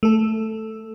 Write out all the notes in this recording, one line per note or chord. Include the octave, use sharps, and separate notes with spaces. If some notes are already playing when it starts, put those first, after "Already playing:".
A3 A4